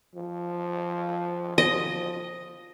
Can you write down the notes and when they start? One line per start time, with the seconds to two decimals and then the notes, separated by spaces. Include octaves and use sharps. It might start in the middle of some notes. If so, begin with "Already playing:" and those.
0.15 F3
1.58 F3 D#5